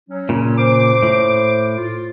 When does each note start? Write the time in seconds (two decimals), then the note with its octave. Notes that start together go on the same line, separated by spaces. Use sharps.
0.09 F#3 C#4
0.29 A#2 C#3
0.58 C5 D6
1.03 A2
1.78 F4